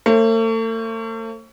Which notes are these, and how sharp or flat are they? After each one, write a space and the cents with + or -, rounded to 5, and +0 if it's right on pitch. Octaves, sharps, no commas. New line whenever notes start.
A3 +40 C5 +40